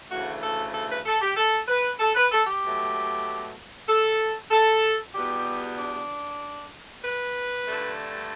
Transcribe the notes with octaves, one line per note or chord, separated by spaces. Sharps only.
D2 C#3 E3 A3 F#4
A4
A4
B4
A4
G4
A4
B4
A4
B4
A4
G4
B2 F#3 A3
A4
A4
E2 B2 G3 B3 G4
D4
B4
G2 D3 A3